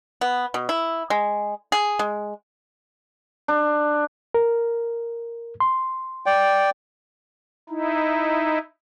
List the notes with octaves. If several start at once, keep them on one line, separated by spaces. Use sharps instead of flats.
B3
B2
E4
G#3
G#4
G#3
D4
A#4
C6
D5 G5
D#4 E4